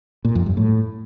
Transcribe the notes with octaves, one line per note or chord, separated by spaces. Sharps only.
A#2
F2
G2
A2